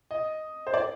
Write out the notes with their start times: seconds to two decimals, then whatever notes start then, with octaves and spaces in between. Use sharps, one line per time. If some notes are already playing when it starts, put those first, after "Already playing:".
0.11 D#5
0.67 C5
0.74 D5